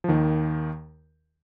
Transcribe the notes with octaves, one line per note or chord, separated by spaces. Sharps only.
F3
D#2 D#3